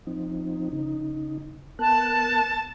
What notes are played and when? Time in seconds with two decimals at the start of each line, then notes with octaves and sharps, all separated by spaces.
0.07 F3 C4 D#4
0.72 C#3 D#4
1.79 B3 A#4 A5 F#6